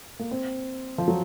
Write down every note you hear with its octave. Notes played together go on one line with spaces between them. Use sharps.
A#3
C4
F3
F#3